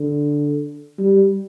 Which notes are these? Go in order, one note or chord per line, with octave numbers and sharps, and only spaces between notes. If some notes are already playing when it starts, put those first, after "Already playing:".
Already playing: D3
G3